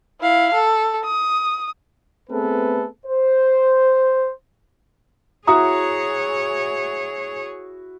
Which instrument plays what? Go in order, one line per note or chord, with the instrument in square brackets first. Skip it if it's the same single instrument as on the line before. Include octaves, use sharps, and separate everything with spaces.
[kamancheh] E4 F5
A4
D#6
[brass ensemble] A3 B3 C4 G#4 A4 B4
C5
[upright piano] E4 F#4 [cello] G#4 C#5 [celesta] A#5 D#6